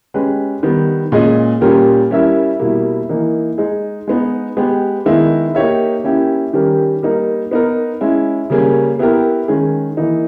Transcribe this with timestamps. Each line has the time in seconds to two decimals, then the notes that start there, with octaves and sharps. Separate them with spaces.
0.14 G#3 C#4 G4 B4
0.63 D#3 G3 B3
1.12 A#2 G#3 C#4 G#4 D#5
1.61 A#2 G3 C#4 G4 A#4
2.11 G3 C#4 E4 A#4 E5
2.60 B2 G3 A#3 E4
3.09 E3 A#3 D#4
3.58 G#3 D#4 G#4
4.08 G#3 B3 D#4
4.57 G#3 B3 G4
5.06 D#3 G#3 B3 E4
5.55 A#3 D#4 G4 C#5 E5
6.04 A#3 C#4 E4 G4
6.53 D#3 G3 C#4 G4 A#4
7.02 G3 A#3 D#4 A#4
7.51 B3 D#4 A#4
8.01 G#3 C#4 E4
8.50 C#3 G3 A#3 C#4 G#4
8.99 B3 E4 G4 A#4
9.48 D#3 G#3 C#4 G#4
9.97 E3 A#3 D#4